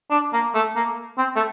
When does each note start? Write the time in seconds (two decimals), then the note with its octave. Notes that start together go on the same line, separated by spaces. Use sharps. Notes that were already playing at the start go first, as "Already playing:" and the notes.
0.11 D4
0.33 A#3
0.54 A3
0.76 A#3
1.18 C4
1.36 A3